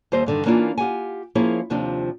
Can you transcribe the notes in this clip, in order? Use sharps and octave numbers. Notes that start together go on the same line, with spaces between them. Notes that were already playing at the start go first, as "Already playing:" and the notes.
D#2 G3 C5 D#5 E5
G2 D3 D#3
E3 A#3 C#4 D4 E4 F4
F4 G4 F#5 G#5
F3 A#3 C#4 E4 G#4 C#5
D#2 C3 F3 D4 F4